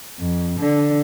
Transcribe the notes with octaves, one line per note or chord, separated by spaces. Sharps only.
F2
D3